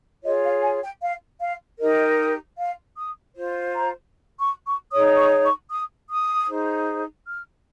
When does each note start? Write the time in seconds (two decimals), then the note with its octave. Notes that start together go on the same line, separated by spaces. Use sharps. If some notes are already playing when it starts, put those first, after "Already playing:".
0.23 F4 G#4 C#5 D#5
0.43 F5
0.62 G#5
0.82 G5
1.01 F5
1.40 F5
1.79 D#4 G4 A#4 D#5
2.58 F5
2.96 D#6
3.36 F4 C5
3.75 A#5
4.40 C#6
4.66 C#6
4.92 D#4 G#4 C#5 D#6
5.18 C#6
5.44 C#6
5.70 D#6
6.09 D#6
6.47 D#4 G#4 C5
7.27 F6